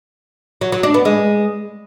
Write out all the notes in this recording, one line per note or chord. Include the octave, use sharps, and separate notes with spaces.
F#3
F#3
D4
B3
G#3